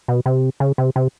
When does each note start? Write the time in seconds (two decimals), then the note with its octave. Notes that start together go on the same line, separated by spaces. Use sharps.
0.08 B2
0.26 C3
0.60 C#3
0.78 C3
0.96 C3